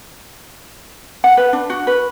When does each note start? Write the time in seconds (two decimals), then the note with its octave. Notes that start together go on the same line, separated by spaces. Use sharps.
1.24 F#5
1.37 B4
1.53 D4
1.70 F#4
1.87 B4